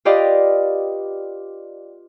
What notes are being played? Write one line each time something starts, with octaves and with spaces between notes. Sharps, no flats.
F4 G4 B4 D5 D#5 F5